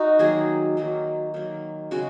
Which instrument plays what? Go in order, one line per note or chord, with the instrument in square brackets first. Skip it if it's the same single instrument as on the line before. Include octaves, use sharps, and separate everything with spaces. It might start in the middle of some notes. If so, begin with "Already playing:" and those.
Already playing: [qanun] D#4 F#4
D#3 F#3 A#3 G#4
D#3 F#3 A#3
D#3 F#3 A#3
C#3 G#3 F#4